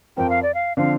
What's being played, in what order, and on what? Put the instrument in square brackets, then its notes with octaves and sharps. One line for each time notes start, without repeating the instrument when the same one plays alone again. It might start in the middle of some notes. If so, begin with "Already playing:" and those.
[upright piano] F2 F3 C4 A#4 [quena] G5
[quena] F5
D5
F5
[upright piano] D3 F3 C4 [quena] F5